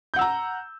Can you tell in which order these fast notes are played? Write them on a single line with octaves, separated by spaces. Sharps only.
G6 F#5 E6 A#5